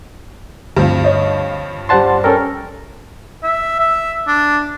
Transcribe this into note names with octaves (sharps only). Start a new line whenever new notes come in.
D2 G2 F3 C4
C#5 D#5
G3 C5 D5 F#5 A5 C6
C#4 A4 A#4 G5
E5
E5
D4